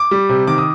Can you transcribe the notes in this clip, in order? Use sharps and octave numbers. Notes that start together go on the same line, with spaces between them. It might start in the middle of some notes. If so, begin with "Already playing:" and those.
Already playing: D6
G3
C3
D#3 D6
D#6